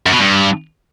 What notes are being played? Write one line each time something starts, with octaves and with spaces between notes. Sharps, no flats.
F#2
B2
G2